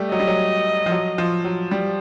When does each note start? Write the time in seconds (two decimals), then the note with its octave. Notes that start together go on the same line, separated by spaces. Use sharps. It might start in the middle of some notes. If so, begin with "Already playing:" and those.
Already playing: G3 A3
0.11 F#3 D#5
0.20 G3
0.28 F#3
0.86 F3
0.91 F#3
1.18 F3
1.44 F#3
1.71 G3